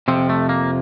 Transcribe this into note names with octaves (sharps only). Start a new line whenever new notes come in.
F2 C3 F3 C4
A3
A#3